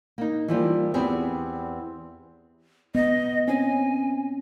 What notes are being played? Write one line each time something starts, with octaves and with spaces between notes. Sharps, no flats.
A#3 D#4
E3 F3 G3 A#3
E2 B3 C4 G4 G#4
B3 D#5
C4 C#4 G#5